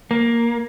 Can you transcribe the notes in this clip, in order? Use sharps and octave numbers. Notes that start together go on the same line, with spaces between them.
A#3